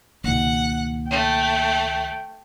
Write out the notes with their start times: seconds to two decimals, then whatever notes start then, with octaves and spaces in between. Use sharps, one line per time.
0.24 C#2 B2 D#3 A#3 F#5
1.10 A3 G5